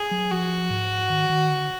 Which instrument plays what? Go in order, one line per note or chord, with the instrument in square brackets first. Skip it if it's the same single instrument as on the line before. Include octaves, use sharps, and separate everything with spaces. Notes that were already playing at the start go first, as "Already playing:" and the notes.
Already playing: [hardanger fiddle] G#4
[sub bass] F#3
[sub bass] F3 [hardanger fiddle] F#4
[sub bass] G#2
D#3
D#3
D3